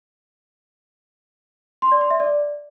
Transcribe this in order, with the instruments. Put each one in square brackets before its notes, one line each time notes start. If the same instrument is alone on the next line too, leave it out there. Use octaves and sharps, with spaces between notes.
[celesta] C6
D5
C6
E5
D5